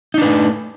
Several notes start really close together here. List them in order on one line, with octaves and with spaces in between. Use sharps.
D#4 D4 B4 A3